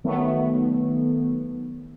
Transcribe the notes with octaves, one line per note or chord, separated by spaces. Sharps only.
D#3 F#3 A3 B3